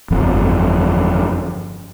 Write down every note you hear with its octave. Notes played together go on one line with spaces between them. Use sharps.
G1 F2